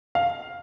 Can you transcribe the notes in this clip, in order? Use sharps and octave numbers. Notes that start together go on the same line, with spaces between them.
F5